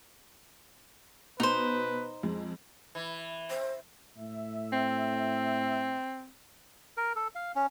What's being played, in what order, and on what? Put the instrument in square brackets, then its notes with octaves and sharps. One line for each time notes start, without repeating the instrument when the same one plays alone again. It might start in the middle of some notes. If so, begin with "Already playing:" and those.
[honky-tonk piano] B2 [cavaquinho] D#4 C5 [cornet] B4
[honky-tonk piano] F2 G#3
[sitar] E3
[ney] C5
[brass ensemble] A2 E5
[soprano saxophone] C4
[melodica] A#4
A4
F5
C#4